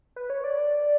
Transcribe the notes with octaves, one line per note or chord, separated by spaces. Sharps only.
B4
C#5
D5